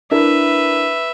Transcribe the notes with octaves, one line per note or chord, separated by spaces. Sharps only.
D4 E4 A#4 B4 E5